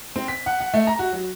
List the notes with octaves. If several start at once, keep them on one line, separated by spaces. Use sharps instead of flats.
C4
B6
F#5
F#5
A3
A#5
F#4
F#3